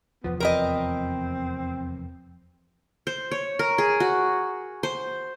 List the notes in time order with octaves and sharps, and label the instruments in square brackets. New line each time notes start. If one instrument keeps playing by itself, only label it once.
[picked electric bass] F1 E2 F3 [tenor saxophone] B3
[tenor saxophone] C4 [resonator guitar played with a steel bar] A#4 B4 D#5
[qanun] C5
C#5
A#4
G#4
F#4
C5